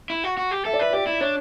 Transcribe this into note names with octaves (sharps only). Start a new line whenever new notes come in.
E4
F#4
F#4
G4
A4 E5
D5
B4 E5
G4 D5
E4
D4 C#5